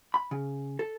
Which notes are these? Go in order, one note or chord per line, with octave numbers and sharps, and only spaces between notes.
B5
C#3
A4